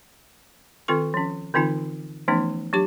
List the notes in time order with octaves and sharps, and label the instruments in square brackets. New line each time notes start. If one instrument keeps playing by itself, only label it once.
[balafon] D#3 C4 F4 A4 C#6
F3 C#4
D3 E3 C4 D#4 F4 A5
E3 F3 A3 B3 C#4 D#4
F#3 D4 G4 D6